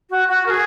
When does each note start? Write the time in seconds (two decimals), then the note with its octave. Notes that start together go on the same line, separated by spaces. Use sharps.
0.10 F#4
0.28 F#4
0.46 A#4
0.50 G#4